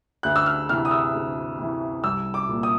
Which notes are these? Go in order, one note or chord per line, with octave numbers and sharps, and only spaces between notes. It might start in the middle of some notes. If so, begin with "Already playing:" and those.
D2 F#6
E6
F6
C3 E3 F6
D#6
E6
D2
C3 E3
C2 E6
D6
A#2
D#6